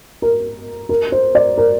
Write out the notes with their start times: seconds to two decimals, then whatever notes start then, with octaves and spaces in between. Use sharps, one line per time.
0.22 A#4
0.89 A#4
1.12 C5
1.35 D5
1.58 A#4